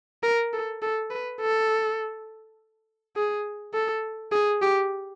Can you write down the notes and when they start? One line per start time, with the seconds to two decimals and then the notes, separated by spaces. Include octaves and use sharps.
0.23 A#4
0.53 A4
0.82 A4
1.11 B4
1.41 A4
3.16 G#4
3.73 A4
4.32 G#4
4.62 G4